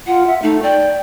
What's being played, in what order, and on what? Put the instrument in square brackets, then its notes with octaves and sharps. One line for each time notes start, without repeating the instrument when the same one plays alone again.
[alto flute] F4 [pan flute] F#5
[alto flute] E5
[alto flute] A3 [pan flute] D#4
[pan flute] D5 [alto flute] G5